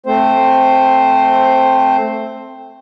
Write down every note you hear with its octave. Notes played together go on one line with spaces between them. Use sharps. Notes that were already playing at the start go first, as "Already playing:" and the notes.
A3 C4 C5